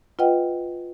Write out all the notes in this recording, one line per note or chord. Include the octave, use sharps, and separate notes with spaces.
F4 B4 D#5 F#5 G5